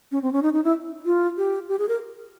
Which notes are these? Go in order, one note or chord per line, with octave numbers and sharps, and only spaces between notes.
C#4
C4
C#4
D#4
D#4
E4
F4
G4
G4
G#4
A#4